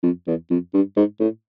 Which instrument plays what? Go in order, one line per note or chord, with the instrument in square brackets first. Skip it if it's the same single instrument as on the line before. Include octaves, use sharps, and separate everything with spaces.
[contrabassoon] F2
E2
F2
G2
G#2
A2